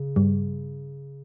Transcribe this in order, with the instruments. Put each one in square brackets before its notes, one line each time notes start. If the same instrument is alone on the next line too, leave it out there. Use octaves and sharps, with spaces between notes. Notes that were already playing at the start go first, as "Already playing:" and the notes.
Already playing: [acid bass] C#3
[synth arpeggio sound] G2 G3